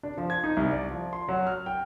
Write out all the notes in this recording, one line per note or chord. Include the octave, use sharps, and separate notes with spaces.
D4
F3
G#6
D#4
C2
D5
F3
C6
F#3
F6
G5